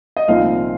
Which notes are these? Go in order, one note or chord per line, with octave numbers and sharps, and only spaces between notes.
D#5
C2 A#2 F3 C4 D#4 F4 F5